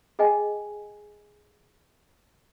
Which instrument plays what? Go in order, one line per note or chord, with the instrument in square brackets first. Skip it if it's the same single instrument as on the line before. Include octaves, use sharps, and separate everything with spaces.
[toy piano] G#4 D#5 G5 G#5